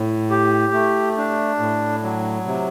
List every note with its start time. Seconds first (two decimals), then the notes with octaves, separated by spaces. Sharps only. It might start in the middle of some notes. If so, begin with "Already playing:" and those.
Already playing: A2
0.30 G4
0.73 A3
1.17 D4
1.59 A2
2.03 F#3
2.46 C3